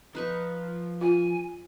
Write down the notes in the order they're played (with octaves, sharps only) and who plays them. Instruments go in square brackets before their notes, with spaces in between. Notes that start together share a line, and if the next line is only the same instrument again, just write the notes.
[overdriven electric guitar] F3 [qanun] D#4 B4 C#6
[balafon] F4 [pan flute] G#5